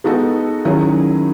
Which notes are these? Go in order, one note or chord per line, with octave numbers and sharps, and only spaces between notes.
G#3 B3 D#4 F#4 A4
D#3 F#3 C#4 E4 G#4